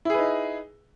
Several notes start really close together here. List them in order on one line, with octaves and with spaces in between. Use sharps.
E4 G#4 B4 D#4